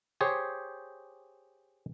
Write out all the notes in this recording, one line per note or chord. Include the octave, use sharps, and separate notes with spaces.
G4 G#4 C5 C#5